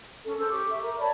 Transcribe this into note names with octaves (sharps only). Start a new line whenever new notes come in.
C#4 A4
A4 C5 E6
G4 C#6 D6
E5
A#4 A#5
C#5 D5 A5 B5